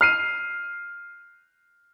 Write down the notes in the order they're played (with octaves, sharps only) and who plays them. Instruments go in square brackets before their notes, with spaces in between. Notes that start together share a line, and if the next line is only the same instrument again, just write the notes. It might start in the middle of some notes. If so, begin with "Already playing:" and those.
[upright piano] F6 C7 D#7